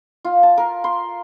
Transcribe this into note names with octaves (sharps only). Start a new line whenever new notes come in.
F4
A5
A#4
C6